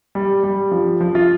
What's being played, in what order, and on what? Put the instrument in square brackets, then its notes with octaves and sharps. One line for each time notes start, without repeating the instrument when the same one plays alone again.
[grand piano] G3
G3
F3
F3
F4